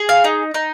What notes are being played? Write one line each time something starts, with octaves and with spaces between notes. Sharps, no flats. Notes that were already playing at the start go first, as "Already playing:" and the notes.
Already playing: G#4
F5
D#4
D#4